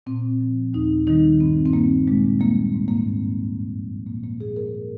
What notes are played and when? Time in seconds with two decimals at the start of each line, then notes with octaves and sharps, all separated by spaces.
0.06 A#2 C4
0.41 F3
0.73 D#2 D#4
1.07 D#3 G3 D#4
1.40 G2 C4
1.66 C4
1.73 G3 A#3
2.07 A#2 G#3
2.40 G3 A#3
2.74 G#2
2.88 A#3
2.96 C4
3.07 F3
3.40 G2
3.73 F3
4.07 A#2 A#3
4.24 A#3
4.40 F3 G#4
4.56 A#4